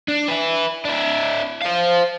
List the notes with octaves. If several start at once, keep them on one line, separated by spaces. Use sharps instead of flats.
D4
E4 B4
D4 E4
C5 F5